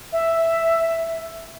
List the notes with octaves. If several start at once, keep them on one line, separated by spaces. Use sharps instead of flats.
E5